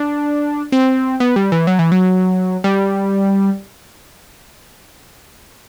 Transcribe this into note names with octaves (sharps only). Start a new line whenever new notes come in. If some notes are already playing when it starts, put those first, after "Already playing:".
Already playing: D4
C4
B3
G3
E3
F#3
E3
F#3
G3